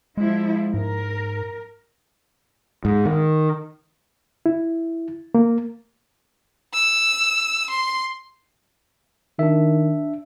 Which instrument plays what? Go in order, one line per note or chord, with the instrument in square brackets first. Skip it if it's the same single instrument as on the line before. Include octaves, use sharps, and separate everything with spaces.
[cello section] F3 E4 [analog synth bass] G#3
[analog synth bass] G#2 [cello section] A#4
[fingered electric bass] G#2
D#3
[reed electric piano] E4
A#3
[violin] E6
C6
[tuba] D#3 [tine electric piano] D4 E5